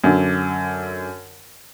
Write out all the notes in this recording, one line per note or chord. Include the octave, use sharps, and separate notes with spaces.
F#2 D3